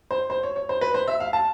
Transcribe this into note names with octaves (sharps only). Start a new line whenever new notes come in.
C5
C5
C#5
C#5
C5
B4
C5
E5
F5
A5